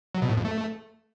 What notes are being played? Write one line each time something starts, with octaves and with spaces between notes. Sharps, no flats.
F#3
B2
A2
F2
A3